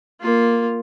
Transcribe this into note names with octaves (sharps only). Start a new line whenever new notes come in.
A#3 F4